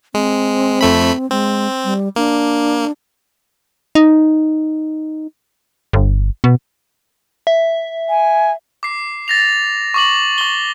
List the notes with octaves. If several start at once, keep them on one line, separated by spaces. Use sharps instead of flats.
G#3 C4
F2 A3 B5
G#3 C4
G3
A#3 D4
D#4
G1
B2
E5
G#5
D6 C7
A6 A#6 F7
C#6 D6 F#7
C#6 G7